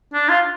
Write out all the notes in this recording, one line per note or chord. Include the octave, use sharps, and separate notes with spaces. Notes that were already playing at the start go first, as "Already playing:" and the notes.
D4
F4